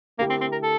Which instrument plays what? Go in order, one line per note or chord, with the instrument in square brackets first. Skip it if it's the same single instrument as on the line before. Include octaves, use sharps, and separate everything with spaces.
[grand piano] D3 A3 E4 G4 A#4 [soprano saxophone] A#3
[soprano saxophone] C4
C4
A#4
A4